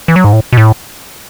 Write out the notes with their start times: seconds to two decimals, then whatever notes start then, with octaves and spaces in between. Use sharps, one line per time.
0.08 E3
0.16 F#3
0.24 G#2
0.33 A2
0.53 B2
0.57 A2